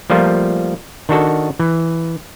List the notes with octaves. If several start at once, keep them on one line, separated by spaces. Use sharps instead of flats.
F3 G3 A3 A#3 F4
D#3 D4 F#4 A4
E3